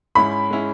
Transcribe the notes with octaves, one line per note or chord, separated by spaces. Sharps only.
G#2 G#3 C#4 E4 B5
G#3 C#4 E4